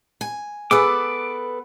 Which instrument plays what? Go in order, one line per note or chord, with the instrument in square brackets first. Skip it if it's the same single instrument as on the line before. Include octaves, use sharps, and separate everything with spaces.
[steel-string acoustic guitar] G#5
[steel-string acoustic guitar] B3 A4 B4 [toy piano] G#4 G#5 E6 [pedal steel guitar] D6